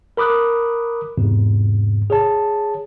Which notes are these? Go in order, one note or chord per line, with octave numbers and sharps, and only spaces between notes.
A#4 B5 D6 D#6 F#6
E2 G#2 C3
G#4 C#5 A5